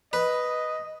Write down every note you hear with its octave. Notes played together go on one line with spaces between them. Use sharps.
B4 D#5